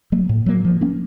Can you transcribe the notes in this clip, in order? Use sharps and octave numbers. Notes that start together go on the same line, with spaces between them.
F#3 A#3
A2
F#3 A#3
F3
A#3 C#4